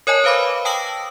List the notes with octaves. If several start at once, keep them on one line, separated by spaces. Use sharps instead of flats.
A#4 C#5 D#5 G#5 A5
B4 C5 F5 B5 D6
G5 A5 D#6 E6 A#6 F#7